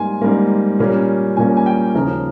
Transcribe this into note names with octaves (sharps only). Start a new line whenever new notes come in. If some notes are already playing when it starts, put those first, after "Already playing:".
Already playing: G#2 G3 A#3 G#5 C6
G#2 G3 A#3
A#2 G3 A#3 C#4
A#2 G3 A#3 C#4 G#5
G#5
G5
D#2 C#3 F3 A#4